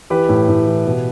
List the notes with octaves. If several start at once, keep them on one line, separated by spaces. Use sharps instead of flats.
E3 G4 B4
A2
A2
E3
B2